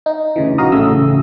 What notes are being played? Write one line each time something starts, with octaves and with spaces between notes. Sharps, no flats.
D#4
D2 C#3 E3
A#1 D#4 F#4 F5 A#5 D#6
A1 C#3 A3 D#6 E6